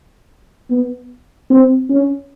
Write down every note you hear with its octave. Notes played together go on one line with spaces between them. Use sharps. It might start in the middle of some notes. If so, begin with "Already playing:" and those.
B3
C4
C#4